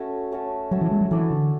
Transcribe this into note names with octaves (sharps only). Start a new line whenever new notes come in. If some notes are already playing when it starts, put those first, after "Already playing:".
Already playing: A3 C#4 F#4 A4
A3 C#4 F#4 A4
F#3 A3 C#4 F#4 A4
E3
G#3
F#3
E3 A3 D4 A4 D5
D3